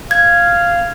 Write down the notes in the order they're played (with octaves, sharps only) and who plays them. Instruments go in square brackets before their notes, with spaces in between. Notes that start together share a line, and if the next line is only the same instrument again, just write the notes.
[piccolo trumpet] F5 [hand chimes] G#6